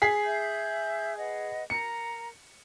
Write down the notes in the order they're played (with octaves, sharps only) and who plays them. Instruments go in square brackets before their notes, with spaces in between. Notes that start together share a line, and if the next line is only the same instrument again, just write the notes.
[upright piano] G#4 B6 C7
[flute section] E5 G6
B4 D#5 F#5
[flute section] A#4 A#5 [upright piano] C#7